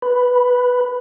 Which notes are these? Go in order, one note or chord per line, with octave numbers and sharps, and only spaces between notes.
B4